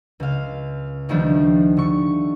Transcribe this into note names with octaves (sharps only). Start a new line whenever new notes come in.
C#2 F5
D2 D#3 F3 G3 A3 D4
D3 C#6